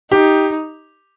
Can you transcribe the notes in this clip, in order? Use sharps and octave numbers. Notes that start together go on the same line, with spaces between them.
D#4 G4